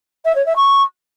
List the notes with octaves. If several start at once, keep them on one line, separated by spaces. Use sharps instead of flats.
E5
C#5
E5
C#6